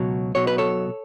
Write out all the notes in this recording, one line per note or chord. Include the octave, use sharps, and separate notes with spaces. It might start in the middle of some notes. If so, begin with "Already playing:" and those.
Already playing: C#2 B2 F#3
B1 B2 F#3 C#5
B4
A4 C#5